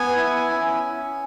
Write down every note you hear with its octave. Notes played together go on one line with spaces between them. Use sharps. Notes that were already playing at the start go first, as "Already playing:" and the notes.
Already playing: B3 G#5
E4
C#4